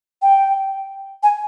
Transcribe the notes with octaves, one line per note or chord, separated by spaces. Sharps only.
G5
G#5